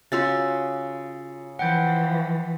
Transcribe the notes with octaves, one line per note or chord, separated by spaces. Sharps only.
C#3 F4 F#4 F5 E6 A6
E3 F3 F#5 G5 G6